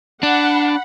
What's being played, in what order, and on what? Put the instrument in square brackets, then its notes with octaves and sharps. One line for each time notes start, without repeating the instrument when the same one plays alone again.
[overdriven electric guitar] D4 [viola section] F#5 B5